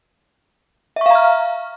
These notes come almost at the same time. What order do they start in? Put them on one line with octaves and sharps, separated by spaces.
E5 C#6 F5 A#5 F6